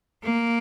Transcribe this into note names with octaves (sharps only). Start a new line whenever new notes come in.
A#3